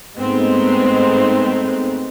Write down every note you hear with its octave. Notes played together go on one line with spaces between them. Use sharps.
G#2 G#3 A3 B3 C4 D#4